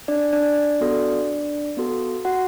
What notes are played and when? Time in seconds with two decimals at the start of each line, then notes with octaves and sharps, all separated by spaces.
0.08 D4 D5
0.33 D4 D5
0.81 B3 F#4 A4
1.77 B3 F#4 A4
2.25 F#4 F#5